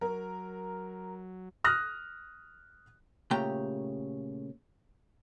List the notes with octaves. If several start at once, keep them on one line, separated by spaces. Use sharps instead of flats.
F#3 A#4
D#6 F6 F#6 A#6
A#2 C#3 A3 G4 G5 A#5